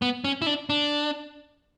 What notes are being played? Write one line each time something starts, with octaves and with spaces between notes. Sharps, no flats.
B3
C#4
E4
D4
D4